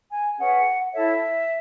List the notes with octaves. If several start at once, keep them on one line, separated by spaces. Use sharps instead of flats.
G#5
C#4 G#4 B4 F#5
E4 A4 C#5 E5